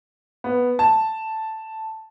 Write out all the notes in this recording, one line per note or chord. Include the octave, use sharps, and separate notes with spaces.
B3
A5